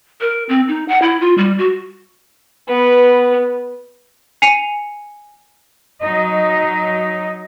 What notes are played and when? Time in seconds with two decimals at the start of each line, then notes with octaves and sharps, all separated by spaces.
0.21 A#4
0.49 C4
0.68 D#4
0.88 F#5
1.02 E4
1.21 F4
1.38 G3
1.58 F#4
2.68 B3 B4
4.42 G#5 C7 C#7 D#7 F7
6.01 F#3 D#4 D#5